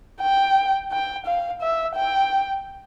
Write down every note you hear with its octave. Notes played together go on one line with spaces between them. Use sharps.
G5
G5
F5
E5
G5